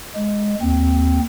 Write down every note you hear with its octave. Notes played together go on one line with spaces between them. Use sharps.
G#3
D#2 C4